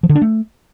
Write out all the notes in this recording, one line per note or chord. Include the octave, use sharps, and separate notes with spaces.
F3
D3
D4
A3